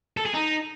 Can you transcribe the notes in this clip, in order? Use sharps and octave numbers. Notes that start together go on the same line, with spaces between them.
A4
G#4
D#4